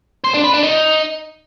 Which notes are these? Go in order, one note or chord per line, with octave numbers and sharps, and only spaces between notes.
C5
D4
B4
D4
D#4